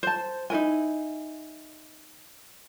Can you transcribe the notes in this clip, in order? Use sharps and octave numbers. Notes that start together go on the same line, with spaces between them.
C5 A5
D#4 E4 A#4 G#5